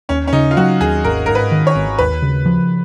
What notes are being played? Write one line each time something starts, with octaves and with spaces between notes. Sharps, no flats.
D#2 C#4
C#4
C#3 D#4
F4
F#3 F#4
D#2 G#4
G#1 A#4
G#2 A#4
B4
D#3
C#5
G#1
D#2 B4
C#3
F3